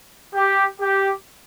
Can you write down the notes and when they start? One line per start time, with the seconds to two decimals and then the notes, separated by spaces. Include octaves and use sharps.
0.35 G4
0.81 G4